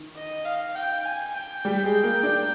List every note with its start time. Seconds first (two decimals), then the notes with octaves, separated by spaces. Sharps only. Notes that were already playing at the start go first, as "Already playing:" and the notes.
Already playing: D#3
0.16 D#5
0.45 F5
0.75 G5
1.05 G#5
1.35 G5
1.65 G3 G4
1.84 G#3 G#4
2.03 A#3 A#4
2.23 D4 D5